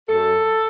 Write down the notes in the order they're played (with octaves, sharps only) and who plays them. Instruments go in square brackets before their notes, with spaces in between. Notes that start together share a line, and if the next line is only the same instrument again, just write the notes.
[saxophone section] F#2 A4